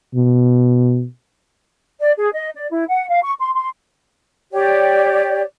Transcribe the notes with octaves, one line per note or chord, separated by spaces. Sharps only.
B2
D5
G#4
D#5
D5
E4
F#5
F5
C#6
C6
C6
G4 C#5 D5